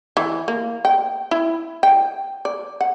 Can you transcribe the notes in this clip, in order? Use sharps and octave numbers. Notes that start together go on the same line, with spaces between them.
E3
A#3
G5
E4
G5
D5
F#5